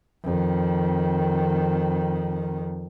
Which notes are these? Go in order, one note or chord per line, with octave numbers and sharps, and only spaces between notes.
F2 D#3